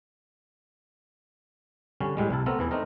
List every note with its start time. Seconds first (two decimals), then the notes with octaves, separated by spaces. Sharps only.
2.00 D3 G3 C#4
2.17 A2 G3 G#3
2.31 C2 E4 A5
2.46 A3 B3 C4 A4 A#4
2.59 E2 E3 E4
2.71 A3 C4 D4 D#4 A#4